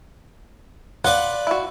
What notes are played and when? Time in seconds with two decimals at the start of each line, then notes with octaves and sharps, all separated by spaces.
1.04 F4 B4 D5 F#5
1.47 E4 F#4